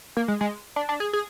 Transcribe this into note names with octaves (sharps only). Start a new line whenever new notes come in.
A#3
G#3
G#3
D4
D4
G#4
G#4